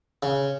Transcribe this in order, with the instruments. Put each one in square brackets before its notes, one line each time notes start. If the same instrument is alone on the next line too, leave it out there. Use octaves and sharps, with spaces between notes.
[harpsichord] C#3